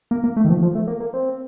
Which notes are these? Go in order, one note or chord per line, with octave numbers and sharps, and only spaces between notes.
A#3
A#3
A3
D#3
F3
F3
A3
A#3
A#3
C4